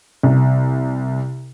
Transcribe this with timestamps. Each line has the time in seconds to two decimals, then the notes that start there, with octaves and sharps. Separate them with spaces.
0.23 C2